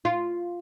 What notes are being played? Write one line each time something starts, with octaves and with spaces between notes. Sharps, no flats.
F4